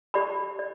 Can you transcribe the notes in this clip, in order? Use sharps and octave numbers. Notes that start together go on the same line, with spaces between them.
G4 D5 B5
D5